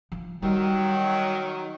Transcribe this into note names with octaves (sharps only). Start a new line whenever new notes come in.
F3
D#3 F#3 G3